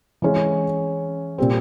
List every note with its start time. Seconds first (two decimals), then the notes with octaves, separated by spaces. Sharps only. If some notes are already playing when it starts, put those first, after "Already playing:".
0.22 E3 G#3 C#4
1.38 A#2 G3 C4